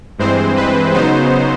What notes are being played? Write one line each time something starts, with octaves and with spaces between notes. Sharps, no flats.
G2 E3 G#3 C4 C5
B4
C#3 F#3 B3 D#4 C5